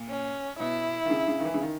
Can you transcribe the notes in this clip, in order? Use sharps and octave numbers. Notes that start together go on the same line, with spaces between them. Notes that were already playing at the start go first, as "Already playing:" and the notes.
Already playing: A#2
C#4
B2 E4
D#3
C#3
C#3
D#3
E3
C#3
D#3